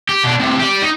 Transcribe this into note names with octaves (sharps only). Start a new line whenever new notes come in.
G4
B2 D4
A2 C3
G4 D5
D#4